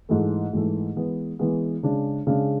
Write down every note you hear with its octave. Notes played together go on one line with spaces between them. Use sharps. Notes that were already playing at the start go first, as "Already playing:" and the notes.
G#2 E3 A3
G#2 E3 A3
E3 G#3 B3
E3 G#3 B3
C#3 G#3 D4
C#3 G#3 D4